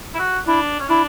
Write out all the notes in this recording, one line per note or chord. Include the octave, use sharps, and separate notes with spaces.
E4
F#4
D4 E4
C#4
D4 E4